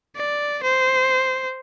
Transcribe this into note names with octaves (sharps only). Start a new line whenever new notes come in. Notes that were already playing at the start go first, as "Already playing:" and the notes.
D5
C5